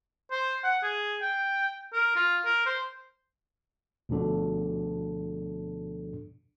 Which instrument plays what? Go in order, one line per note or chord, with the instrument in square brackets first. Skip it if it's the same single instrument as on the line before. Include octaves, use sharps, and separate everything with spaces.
[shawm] C5
F#5
G#4
G5
A#4
F4
A#4
C5
[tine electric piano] D2 B2 F3 D4 A4